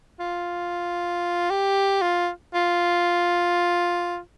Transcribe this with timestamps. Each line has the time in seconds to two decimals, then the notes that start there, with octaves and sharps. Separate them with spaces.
0.20 F4
1.50 G4
2.02 F4
2.54 F4